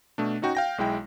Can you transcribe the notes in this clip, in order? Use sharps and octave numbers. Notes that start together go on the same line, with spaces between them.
B2 A3 D4
C#4 D#4 F#4 G5
F5 G5 A#6
B1 G#3 E4 G5